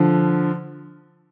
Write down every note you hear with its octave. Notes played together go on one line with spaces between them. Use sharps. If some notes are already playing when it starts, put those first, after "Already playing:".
Already playing: D3 F3